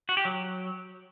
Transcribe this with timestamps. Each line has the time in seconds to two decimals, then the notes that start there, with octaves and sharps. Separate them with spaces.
0.09 F#4
0.17 G4
0.25 F#3